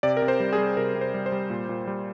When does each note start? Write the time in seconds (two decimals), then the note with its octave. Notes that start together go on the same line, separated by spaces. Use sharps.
0.03 C3 D5
0.17 A#4
0.22 C3
0.28 C5
0.40 G3
0.53 G#4
0.58 G3
0.77 C3 A#4
0.95 C3
1.01 C5
1.14 G3
1.26 C5
1.32 G3
1.50 A#2
1.69 A#2
1.87 G3